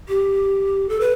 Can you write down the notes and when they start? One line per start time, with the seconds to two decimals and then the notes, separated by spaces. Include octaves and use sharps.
0.08 G4
0.89 A4
1.00 B4